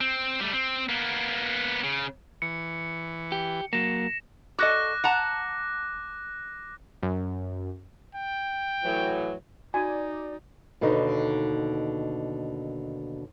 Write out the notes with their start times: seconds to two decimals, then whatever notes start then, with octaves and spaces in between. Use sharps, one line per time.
0.01 C4
0.40 G3 A3
0.53 C4
0.89 A#3 B3
1.84 C#3
2.42 E3 C#7
3.32 G4
3.73 F#3 A#3 A#6 E7
4.59 F#4 A4 D#5 D6 F#6 A#6
5.04 F#5 A5 A#5
7.03 F#2
8.15 G5
8.84 A2 E3 F#3
9.74 D#4 F#4 D5 G#5
10.81 D#2 B2 D3 D#4